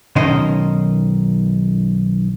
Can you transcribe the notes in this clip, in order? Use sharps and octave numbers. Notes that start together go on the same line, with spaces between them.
B1 D#3 C#4 D#5 C6